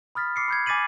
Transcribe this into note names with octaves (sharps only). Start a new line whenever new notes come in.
B5 D#6 F6 A6 B6
D6 C7 C#7
B5 G6 G#6
G#5 D6 A6 B6 D#7 F#7